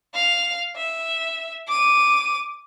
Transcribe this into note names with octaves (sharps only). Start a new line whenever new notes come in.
F5 F7
E5
D6 D#7